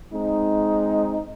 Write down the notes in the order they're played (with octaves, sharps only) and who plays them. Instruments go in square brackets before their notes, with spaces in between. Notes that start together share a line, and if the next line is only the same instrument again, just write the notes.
[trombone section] G#3 C4 D#4